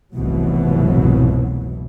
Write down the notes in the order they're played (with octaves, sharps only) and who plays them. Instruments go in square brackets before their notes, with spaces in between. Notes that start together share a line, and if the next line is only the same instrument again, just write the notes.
[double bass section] F1 C2 G#2 B2 E3 F#3